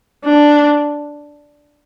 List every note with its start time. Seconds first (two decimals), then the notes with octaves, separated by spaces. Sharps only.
0.25 D4